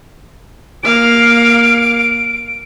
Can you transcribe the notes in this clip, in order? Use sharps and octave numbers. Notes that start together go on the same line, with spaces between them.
A#3 F5 D7